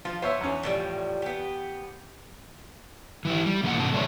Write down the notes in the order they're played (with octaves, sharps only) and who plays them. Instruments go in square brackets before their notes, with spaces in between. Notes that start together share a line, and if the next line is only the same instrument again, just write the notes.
[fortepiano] F3 [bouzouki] F4
[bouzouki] B3 [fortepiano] C5 C#5 E5
[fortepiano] E2 C#4
[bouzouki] A2 F3 G3
B3 G4
[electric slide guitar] E3 E4 G4
G3
A#2 E3 A#3 D4 F#5
G#2 C3 A5
A2 D3 G#3 D4 C#5 E5